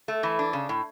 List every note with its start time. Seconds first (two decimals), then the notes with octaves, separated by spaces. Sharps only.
0.08 A3
0.23 E3
0.39 D4
0.53 C#3
0.69 A2